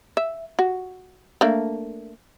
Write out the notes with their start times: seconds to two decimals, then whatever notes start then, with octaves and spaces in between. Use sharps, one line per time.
0.17 E5
0.59 F#4
1.41 A3 A#3 D4